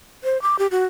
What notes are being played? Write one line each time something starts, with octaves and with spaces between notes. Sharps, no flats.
C5
D6
G4
F#4